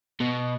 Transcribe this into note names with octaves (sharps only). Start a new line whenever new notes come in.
B2